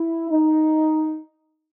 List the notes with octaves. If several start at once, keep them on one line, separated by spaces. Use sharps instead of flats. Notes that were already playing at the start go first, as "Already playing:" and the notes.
Already playing: E4
D#4